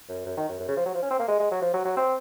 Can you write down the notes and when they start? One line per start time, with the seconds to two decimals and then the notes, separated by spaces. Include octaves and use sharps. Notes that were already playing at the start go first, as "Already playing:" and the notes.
0.09 F#2
0.26 F#2
0.37 D#3
0.49 F#2
0.60 F#2
0.68 C#3
0.77 F3
0.86 F#3
0.94 F3
1.02 C#4
1.10 C4
1.19 A#3
1.28 G#3
1.40 G#3
1.51 F#3
1.62 F3
1.73 F#3
1.85 F#3
1.96 C4